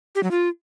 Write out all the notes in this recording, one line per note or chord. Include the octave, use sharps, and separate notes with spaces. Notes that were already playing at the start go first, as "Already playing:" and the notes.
G4
F#3
F4